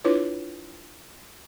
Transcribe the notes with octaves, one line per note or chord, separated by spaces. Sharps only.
D4 E4 F4 B4 C#5